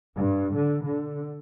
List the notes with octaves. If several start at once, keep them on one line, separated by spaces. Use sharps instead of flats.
G2
D3
D3